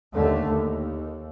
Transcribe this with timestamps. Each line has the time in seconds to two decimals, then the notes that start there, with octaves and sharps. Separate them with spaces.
0.12 D#2 D3 A3
0.48 D#2